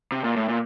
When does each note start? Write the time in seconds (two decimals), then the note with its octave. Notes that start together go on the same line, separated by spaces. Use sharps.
0.12 C3
0.24 A#2
0.36 A2
0.48 A#2